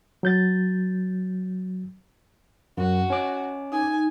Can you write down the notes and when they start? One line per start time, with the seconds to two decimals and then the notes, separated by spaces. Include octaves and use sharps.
0.23 F#3 G6 A6
2.77 F#2 F#4
3.10 C#4 D6
3.72 D#4 G#5